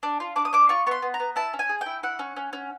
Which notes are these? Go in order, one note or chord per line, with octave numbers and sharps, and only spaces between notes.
D4
F4
D4 D6
D#6
D4 D6
F4 C#6
B3 C6 C#6
B3
A#5
B3
E4 A5
C#4
G#5
G#4
G5
E4
E4 F#5
C#4
C#4
C#4